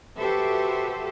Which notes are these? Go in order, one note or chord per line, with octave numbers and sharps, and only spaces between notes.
F#4 G4 A4 B4 C5 E5